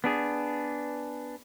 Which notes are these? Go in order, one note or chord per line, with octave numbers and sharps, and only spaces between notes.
B3 D4 G#4